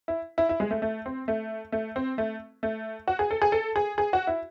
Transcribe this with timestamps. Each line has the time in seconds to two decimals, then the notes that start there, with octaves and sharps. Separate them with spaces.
0.08 E4
0.38 E4
0.49 E4
0.60 G#3
0.71 A3
0.82 A3
1.06 C4
1.28 A3
1.72 A3
1.96 C4
2.18 A3
2.63 A3
3.08 F#4
3.19 G#4
3.31 A4
3.42 G#4
3.52 A4
3.76 G#4
3.98 G#4
4.13 F#4
4.27 E4